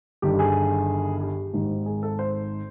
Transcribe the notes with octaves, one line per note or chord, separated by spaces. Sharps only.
G1 G2 D#3 G4
G#4
G4
G#1 G#2 D#3
G#4
A4
C5